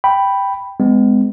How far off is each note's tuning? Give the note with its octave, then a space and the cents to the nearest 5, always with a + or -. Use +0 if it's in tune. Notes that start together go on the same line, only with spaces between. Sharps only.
G5 +0 B5 +0
G#3 +0 B3 +40